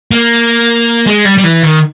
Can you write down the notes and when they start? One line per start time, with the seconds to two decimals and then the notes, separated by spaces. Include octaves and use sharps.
0.11 A#3
1.07 G#3
1.25 G3
1.37 G3
1.44 E3
1.63 D#3